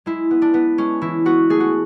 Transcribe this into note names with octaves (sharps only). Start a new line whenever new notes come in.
G#3 E4
B3
D4
B3
G#3 C#4
E3 E4
B3 F#4
A3 G#4
F#4